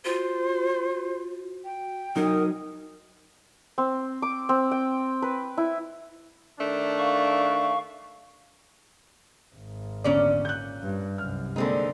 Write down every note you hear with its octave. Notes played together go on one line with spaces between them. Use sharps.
F4 F#4 C5
G5
F#3 D#4 A#4 D#5 D#6
C4
D6
C4
G5
B4
E4
D#3 A3 D4
F5 C#6
G#1
E2 A#2 D3 C#4 D5
F#6 G6
G2
C2 F#2 F6
D3 G#3 A#3 C4 D#4 A4